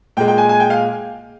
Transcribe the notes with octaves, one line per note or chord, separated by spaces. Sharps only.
A#2 G#3 G5
G5
G#5
G#5
G5
F5